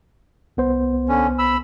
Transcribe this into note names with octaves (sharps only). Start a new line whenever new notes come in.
C2 B3 C5
D3 C#4
B5 E6